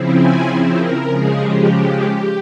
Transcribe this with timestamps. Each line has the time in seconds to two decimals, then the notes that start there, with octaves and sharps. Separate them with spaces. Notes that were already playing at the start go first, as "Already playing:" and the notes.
Already playing: C#3 F3 C4 E4
0.15 G#5
0.76 A#4
1.07 C#3 F3 G#3 G#4
1.38 G4